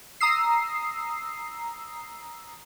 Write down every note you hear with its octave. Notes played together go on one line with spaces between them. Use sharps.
A#5 D#6 E6 C7